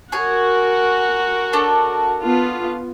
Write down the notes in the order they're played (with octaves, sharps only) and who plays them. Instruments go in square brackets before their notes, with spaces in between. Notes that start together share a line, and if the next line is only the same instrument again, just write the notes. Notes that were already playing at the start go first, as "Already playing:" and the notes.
[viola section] F#4 A#4 [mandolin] G#4 C#5 G#5
[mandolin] D4 A4 C#5
[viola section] B3 F4